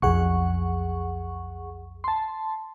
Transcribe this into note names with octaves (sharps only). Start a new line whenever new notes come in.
B1 F2 G#4 F#5 C#6
A5 C6